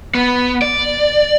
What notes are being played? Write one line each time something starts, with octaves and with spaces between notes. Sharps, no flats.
B3
D5